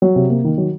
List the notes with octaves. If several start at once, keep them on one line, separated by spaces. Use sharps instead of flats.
F#3
C3
A#3
D#3
F#3